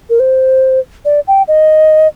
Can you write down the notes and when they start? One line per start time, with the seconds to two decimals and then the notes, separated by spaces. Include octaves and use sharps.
0.10 A#4
0.20 C5
1.05 D5
1.28 G5
1.48 D#5